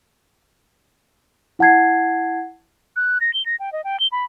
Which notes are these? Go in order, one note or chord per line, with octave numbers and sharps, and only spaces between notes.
E4 F#5 A5 G#6 C7
F#6
A#6
G7
A#6
G5
D#5
G5
G7
B5